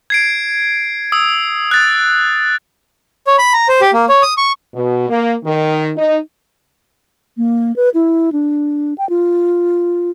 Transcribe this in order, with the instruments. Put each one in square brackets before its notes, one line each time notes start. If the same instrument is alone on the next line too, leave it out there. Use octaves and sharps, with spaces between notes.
[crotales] G#6 C7 D7
D#6 E6
F#6 A6
[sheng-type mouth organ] C#5
B5
A#5
C5
G4
A#3
C#5
D#6
C#6
[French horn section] B2
A#3
D#3
D#4
[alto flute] A#3
B4
E4
D4
G5
F4